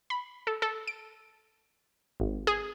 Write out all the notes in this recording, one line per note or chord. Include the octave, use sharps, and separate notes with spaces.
B5
A4
A4
D7
G#1
G#4